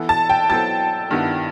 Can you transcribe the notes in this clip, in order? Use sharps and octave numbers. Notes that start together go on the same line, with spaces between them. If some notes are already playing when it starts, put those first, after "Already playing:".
Already playing: E3 B3 E4 A4
A5
G5
F#3 B3 E4 A4 C5 A5
G2 D#3 G3 B3 E4